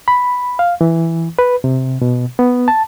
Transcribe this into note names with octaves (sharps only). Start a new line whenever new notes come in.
B5
F5
E3
B4
C3
B2
B3
A5